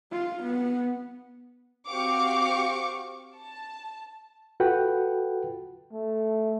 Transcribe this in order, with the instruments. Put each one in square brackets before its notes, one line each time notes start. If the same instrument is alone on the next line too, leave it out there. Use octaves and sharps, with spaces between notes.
[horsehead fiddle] F4
B3
[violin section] C4 F#4 G4 F5 C#6 D6
A5
[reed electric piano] F4 F#4 A4 B4 F#5 G5
[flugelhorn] A3